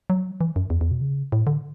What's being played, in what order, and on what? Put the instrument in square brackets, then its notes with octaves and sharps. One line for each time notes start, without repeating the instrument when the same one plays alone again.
[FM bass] F#3
E3
F#2
E2
E2
B2
C#3
A2
D3